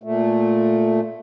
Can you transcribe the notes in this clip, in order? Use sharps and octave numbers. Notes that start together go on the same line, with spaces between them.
A#2 A3